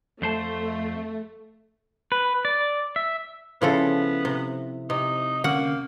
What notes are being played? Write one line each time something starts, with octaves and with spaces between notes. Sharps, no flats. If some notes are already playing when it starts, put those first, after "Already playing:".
F2 A3 C5 A5
B4
D5
E5
C#3 F3 B3 E4 A4 E5
C3
C3 D#4
D3 A#3 C#4 F#5 C#6